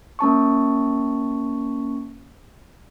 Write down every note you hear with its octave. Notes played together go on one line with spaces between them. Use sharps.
A#3 C#4 A5 C#6